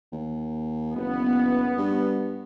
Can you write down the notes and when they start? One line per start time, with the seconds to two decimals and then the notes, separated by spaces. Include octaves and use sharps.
0.12 D#2
0.96 F#1 B3
1.77 G2